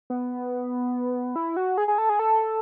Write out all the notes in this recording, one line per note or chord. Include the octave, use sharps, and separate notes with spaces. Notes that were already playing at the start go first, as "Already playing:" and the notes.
B3
E4
F#4
G#4
G#4
A4
G#4
A4